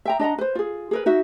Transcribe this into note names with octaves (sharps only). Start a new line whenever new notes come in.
E5 G5 A#5
D4 D#5 F#5 A#5
B4 C5
F4 G#4
G#4 A#4 B4
D#4 F#4 E5